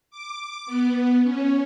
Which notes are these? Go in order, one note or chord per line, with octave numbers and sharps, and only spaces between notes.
D6
B3
C#4